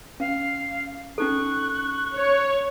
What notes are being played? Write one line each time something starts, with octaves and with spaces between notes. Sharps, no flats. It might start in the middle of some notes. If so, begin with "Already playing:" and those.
C#4 F5
C#4 D#4 A4 C#6 F#6
C#5